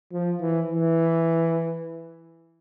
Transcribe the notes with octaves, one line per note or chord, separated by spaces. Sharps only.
F3
E3
E3